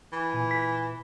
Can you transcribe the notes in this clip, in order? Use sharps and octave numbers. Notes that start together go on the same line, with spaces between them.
E3
A#2 G#5
B6